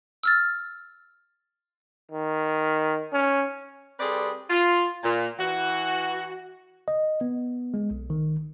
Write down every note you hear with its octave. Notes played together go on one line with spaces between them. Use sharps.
E6 F6 A6
D#3
C#4
G3 C4 G#4 A4 B4 D5
F4
A#2
E3 F#4
D#5
B3
G#3
B1
D#3